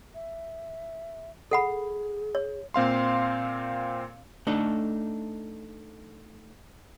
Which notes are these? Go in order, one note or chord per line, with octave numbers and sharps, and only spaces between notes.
E5
G#4 A4 F#5 B5
C#5
A#2 C4 F5 C6
A3 D4 D#4 A4